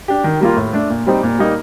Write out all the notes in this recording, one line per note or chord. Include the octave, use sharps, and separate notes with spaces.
D4 G4
D#3
G3 A#3 F4
A2
A3 D4
A#2
G3 C4 D#4
A#2
G3 A#3 D#4